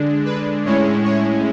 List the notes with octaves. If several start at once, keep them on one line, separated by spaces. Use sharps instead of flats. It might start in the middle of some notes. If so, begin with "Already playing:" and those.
Already playing: D3 G#3 D4
B4
A2 G#3 C#4 E4 C#5
C#5